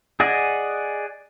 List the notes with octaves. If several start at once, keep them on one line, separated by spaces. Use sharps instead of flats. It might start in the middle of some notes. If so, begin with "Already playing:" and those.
G#4 D5 D#5 F#5 G#5